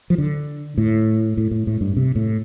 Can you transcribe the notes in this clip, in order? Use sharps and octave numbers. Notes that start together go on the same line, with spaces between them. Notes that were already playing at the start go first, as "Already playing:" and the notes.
F3
D3
A2
A2
A2
A2
G2
C3
A2